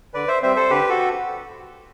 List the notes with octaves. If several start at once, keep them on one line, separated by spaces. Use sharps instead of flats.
D3 B4 D5
C5 E5
G3 C4 C5 E5
A4 C5
D3 G4 B4
F#4 A4